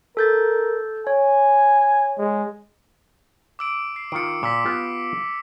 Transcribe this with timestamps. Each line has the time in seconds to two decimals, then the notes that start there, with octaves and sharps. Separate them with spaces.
0.17 A4 A#4 G6 A6
1.07 C#5 G#5
2.18 G#3
3.59 D6 E6 D7
3.96 C7
4.12 D#3 F4 C#7 D7
4.43 A#2 D6 E6 B6
4.65 B3 F4 G4